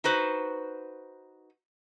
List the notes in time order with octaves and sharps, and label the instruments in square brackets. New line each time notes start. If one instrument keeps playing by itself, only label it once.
[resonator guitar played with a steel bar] D#4 F#4 B4 C5